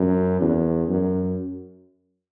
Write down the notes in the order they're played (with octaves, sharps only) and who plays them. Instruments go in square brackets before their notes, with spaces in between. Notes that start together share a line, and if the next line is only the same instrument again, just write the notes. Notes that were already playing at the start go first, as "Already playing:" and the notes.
Already playing: [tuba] F#2
E2
F#2